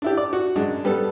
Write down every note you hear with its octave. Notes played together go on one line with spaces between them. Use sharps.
D4 E4 G4
D5
F#4
F#2 G#3 D4
G3 B3 A4